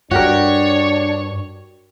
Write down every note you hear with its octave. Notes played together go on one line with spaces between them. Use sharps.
G2 D4 F#4 G4 A#4 C#5